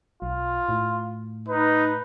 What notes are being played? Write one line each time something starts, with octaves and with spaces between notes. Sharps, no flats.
B1 F4
A2
D#4 B4